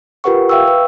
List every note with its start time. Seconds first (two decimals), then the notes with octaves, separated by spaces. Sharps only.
0.24 F4 G4 A#4 B4 F#5 C#6
0.49 E5 F5 G5 C#6 E6
0.68 B4